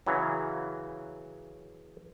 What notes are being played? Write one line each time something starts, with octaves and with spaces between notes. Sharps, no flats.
C#3 E3 F#3